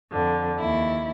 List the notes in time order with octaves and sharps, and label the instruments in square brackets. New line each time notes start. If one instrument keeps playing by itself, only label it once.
[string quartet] F2 D3
D#2 E4